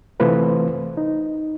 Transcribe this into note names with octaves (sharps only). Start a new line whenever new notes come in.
C3 E3 A3 F4 B4 C5
D#4